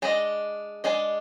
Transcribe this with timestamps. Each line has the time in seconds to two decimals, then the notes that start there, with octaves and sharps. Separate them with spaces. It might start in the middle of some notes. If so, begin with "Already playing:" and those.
0.02 G#3 D4 G#4 D#5
0.84 G#3 D4 G#4 D#5